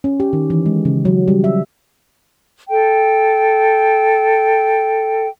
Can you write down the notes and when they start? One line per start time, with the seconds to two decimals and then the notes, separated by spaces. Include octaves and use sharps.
0.04 C#4
0.20 G4
0.33 D#3
0.50 E3
0.66 G#3
0.85 C#3
1.05 F#3
1.28 G3
1.44 E5
2.69 A4 G5